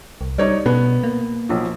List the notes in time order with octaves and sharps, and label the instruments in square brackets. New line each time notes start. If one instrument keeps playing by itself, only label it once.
[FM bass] C2
[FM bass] G3 [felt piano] D#4 C#5 D5
[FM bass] B2 [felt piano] B3
[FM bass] A#3
[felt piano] B1 F3